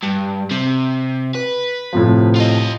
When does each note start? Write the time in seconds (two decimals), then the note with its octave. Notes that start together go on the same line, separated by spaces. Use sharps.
0.03 G2
0.51 C3
1.35 B4
1.93 A2 C3 F3
2.36 F4 D#5